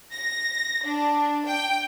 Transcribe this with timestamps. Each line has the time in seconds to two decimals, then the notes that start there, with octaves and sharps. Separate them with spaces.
0.11 A#6
0.85 D4
1.46 G5